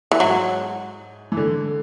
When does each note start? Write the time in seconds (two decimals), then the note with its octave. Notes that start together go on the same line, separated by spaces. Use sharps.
0.12 E3
0.20 G#2 F#3
1.32 E3
1.37 D3